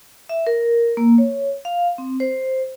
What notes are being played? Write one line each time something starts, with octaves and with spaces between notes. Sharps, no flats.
E5
A#4
A#3
C#5
F5
C4
C5